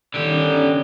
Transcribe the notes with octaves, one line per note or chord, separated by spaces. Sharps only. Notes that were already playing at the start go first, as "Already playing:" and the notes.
D3 D#3 C#4 G4